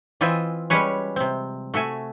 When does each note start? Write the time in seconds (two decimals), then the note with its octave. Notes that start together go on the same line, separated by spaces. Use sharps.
0.21 E3 C4 F4 D#5 E5 G#5
0.70 G3 G#3 C#4 B4 C#5
1.16 C3 C4
1.74 A3 F#4 E5 G#5